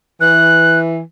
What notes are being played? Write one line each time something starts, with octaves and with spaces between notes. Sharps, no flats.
E3 F#6